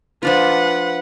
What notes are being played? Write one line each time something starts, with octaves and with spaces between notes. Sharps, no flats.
F3 D4 F4 B4 F#5